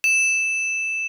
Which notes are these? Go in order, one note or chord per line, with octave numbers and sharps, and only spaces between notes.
E7